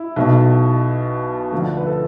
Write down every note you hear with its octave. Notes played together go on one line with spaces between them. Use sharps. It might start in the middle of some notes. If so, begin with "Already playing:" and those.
Already playing: E4
B1 B2
D2 D3 F3 F4
B4
A4